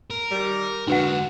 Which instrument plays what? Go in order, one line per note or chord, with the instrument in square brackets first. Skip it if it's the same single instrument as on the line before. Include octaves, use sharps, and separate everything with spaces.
[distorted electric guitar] A#4
[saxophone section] D#3 G3
[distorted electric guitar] D3 G#3 [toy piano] D4 B4 F#5 [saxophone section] F#4